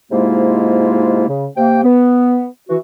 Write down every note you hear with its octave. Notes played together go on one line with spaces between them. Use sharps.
G#2 C3 G#3 A#3 E4 F4
C#3
C3 A#3 G5
B3
E3 F#4